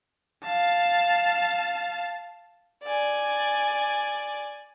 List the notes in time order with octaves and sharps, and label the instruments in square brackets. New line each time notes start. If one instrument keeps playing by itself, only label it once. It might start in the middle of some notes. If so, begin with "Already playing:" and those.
[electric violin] F5 A5
[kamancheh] D5 G#5